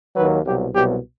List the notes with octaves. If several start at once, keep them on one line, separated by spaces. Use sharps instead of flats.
D#2 D#3 F#3 B4
C2 B2 F#3 G4
C2 B2 F#3 G4